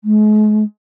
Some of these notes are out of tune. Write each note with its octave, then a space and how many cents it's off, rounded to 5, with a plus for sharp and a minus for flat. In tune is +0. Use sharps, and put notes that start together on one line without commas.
G#3 +40